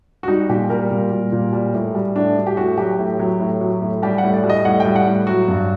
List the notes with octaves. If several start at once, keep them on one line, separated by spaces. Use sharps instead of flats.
F#4
G3 D#4
A#2 G4
G3 A#4
A#2
G3
A#2
G3
A2
G3
A2 D4
G3
G4
A2 F#4
F#3 G4
A2
F#3
A2
F#3
A2
G3 G4
F#5
A2
D5
G3
D#5
A2 F#5
G5
G3
F#5
A2
F#3 F#4
G2